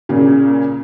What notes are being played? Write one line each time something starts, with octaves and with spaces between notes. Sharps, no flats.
A#2 C#3